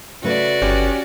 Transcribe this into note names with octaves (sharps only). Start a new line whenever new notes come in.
C#3 A3 F#4 B4 D5
G1 C#4 G4